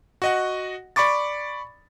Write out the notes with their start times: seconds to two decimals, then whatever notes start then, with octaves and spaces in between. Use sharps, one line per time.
0.22 F#4 D#5 F#5
0.96 D5 B5 C#6 D6 A6